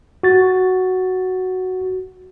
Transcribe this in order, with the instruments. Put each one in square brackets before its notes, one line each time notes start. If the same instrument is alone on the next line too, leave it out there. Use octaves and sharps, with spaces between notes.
[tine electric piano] F#4 A6